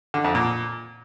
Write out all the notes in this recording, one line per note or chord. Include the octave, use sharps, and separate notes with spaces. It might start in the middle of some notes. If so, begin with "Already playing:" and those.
D3
F2
A#2